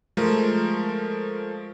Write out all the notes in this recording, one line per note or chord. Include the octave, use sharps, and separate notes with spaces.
F3 G#3 A3 A#4